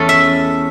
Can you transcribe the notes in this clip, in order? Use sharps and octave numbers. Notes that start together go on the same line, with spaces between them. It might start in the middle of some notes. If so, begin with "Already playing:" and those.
Already playing: E2 A3 C#4 A4
E5